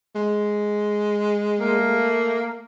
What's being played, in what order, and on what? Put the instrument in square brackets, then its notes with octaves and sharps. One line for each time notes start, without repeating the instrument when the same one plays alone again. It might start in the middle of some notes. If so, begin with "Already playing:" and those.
[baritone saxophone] G#3
[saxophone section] A3 A#3